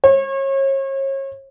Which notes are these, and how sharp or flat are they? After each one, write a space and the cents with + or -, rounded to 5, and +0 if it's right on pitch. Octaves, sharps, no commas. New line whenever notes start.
C#5 -35